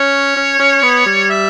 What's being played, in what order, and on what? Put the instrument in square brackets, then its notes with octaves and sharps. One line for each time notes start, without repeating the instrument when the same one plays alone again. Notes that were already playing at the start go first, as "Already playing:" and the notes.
Already playing: [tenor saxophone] C#4 [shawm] C#5
[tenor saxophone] C#4
C#4
B3
G3
[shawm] E5